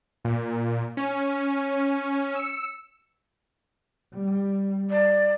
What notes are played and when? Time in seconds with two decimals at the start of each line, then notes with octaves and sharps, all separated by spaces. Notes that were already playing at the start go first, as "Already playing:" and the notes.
0.25 A#2
0.97 C#4
2.35 E6 C#7
4.14 G3
4.90 D5